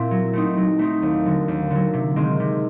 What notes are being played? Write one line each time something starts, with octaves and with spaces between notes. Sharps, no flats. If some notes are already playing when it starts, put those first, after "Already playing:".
Already playing: A#2 C4 E4
F#3
A3 C4 D#4
F#3
A3 C4 D#4
D#2
D3 F#3
D#2
D3 F#3
C3
D#3 G#3 C4
C3